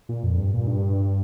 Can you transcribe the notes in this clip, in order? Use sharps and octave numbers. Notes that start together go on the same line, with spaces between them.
A#2
F2
G2
A#2
G2